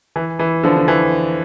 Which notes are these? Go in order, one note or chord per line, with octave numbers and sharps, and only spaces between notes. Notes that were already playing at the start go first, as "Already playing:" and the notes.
E3
E3
D3 F3
D3
E3